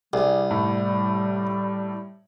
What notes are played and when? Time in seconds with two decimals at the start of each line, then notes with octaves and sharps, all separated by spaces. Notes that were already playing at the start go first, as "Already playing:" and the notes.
0.13 C2 G3 G#4
0.51 A2